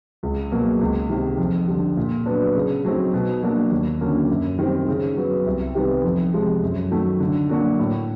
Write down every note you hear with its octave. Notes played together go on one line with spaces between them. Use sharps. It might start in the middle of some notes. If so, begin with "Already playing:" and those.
C#2
B2 F#3 A#3
C#2
C3 D#3
F2
D3 G3
A#2
F#3 B3 D4
C#3
F#3 A3 C4 D#4
B2
F#3 A#3 D4
D#2
D3 F#3 A#3 C#4
F#2
D#3 G3 C4
C#3
F#3 B3
C2
C3 D#3 G3 B3
F2
C3 F3 G#3
F#2
D#3 F#3 A3
D3
F#3 A#3 D4 F#4
A2